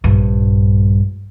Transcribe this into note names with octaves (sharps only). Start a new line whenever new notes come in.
A#1 G2